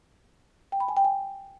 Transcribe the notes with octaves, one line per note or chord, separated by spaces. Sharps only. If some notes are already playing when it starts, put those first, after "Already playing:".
G5
B5
G#5
G5
G#5